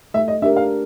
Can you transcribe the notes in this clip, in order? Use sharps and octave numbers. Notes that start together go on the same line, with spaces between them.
A3 E5
D#5
D4 G4 A#4 E5
F5